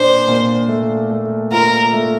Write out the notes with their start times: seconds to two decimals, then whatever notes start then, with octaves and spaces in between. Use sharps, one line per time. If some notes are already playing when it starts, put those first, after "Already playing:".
Already playing: A#2 D4 C5
0.27 A#2
0.68 A3
1.10 A3
1.52 F4 A#4
1.93 A3